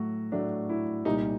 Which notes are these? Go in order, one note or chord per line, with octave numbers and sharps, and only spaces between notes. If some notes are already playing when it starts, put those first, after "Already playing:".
Already playing: A2 F#3 A3 F#4
A2 F#3 A3 D4
E4
C2 A#2 G3 D#4